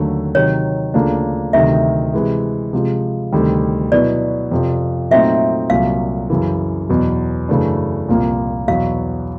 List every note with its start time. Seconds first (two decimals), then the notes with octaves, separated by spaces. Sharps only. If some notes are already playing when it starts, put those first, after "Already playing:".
Already playing: D#2 D3 F#3 A3
0.35 C3 D#3 F#3 C#5
0.94 D2 C#3 F3 A#3 D4
1.53 D2 C3 D#3 F#3 E5
2.13 C3 E3 G#3
2.73 C3 F3 G#3
3.32 D2 C3 D#3 G3
3.92 B2 F#3 B3 E4 D5
4.51 F2 C3 F3
5.11 A#2 F#3 A3 C4 D#4 E5
5.70 C2 A#2 F#3 F5
6.30 F#2 C#3 E3
6.89 E2 B2 F#3
7.49 F#2 C#3 E3 A3 D4
8.08 C2 A#2 F3 A#3
8.68 E2 B2 F#3 F5